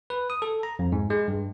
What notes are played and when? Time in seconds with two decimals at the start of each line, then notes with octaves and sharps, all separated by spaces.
0.10 B4
0.30 D#6
0.42 A4
0.63 A#5
0.79 F2
0.92 G#2
1.10 G#3
1.28 G2